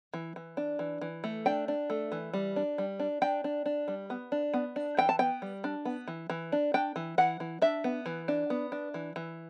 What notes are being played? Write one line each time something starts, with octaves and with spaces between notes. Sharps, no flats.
E3
E3
D4
E3
E3
A3
D4 G5
D4
A3
E3
G3
D4
G3
D4
D4 G5
D4
D4
G3
B3
D4
B3
D4
E3 G5
A5
B3 G5
G3
D4
B3
E3
E3
D4
D4 G5
E3
E3 F#5
E3
D4 E5
B3
E3
D4
B3
D4
E3
E3